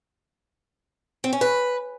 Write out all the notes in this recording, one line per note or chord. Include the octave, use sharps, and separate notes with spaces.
C4
C#4
B4